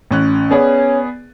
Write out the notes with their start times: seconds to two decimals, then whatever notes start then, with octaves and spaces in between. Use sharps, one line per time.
0.11 A1 C#4 F#6
0.51 B3 C#4 G#4 D5